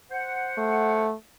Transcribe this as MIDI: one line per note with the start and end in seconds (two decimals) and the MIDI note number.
0.11 1.05 72
0.11 1.05 78
0.58 1.14 57